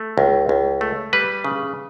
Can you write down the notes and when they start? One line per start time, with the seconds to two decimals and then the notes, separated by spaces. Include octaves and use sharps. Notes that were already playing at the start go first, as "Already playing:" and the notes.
Already playing: A3
0.18 C#2
0.49 C#2
0.81 A3
1.13 G3 B4
1.44 C#3